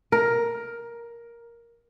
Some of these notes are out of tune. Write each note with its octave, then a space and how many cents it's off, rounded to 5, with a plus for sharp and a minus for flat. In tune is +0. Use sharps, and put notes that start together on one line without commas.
A#4 +10